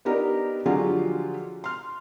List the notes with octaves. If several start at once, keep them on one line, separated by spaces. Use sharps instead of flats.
B3 D4 D#4 G4 A#4
D3 F3 F#3 G#3 F4 G4
C6 F6